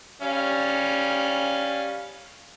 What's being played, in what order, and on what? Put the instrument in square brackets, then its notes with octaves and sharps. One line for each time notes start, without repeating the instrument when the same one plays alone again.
[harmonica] G3 C#4 F5